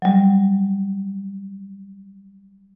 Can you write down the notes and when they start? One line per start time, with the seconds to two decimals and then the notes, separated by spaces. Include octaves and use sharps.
0.02 F#3 G3